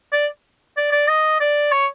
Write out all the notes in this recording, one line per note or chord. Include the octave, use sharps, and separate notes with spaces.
D5
D5
D5
D#5
D5
C#5